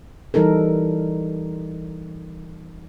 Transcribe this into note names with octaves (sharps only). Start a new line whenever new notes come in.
E3 G3 D#4 A4 A#4